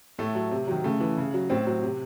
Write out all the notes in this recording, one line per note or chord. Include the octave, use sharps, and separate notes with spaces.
A2 A3
F#3
C3
D#3 F#3
C#3 A3
E3
C#3
F#3
A2 C4
F#3
C3